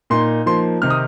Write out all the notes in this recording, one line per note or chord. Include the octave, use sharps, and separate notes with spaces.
A#2 A#3 D#4 C6
F3 A#3 D#4 C6
C3 D#3 C4 D#4 F6
D#6